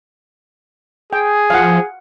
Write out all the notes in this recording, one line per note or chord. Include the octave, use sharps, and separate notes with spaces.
G#4 G5
F3 F5 F#5